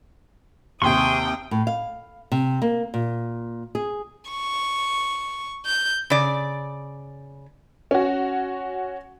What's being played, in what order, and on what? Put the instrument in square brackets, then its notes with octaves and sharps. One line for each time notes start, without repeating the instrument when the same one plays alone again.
[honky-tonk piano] D#2 C3 [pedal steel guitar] G#4 C6 C#6 [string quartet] G5 D#6
[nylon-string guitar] A2
F5
C3
A#3
A#2
G#4
[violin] C#6
G6
[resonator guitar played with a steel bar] C#3 D5
[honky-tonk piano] C#4 F#4